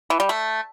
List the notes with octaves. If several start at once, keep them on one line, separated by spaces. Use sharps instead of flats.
E3
G3
A3